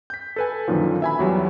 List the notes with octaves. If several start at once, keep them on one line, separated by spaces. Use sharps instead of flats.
G6 B6
A4 B4 G#5
F#2 A#2 D3 D#3 F3
E5 G#5 B5
E2 F#3 G3